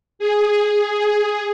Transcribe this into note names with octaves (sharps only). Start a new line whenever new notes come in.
G#4